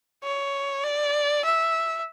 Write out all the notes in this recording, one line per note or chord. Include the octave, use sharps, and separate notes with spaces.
C#5
D5
E5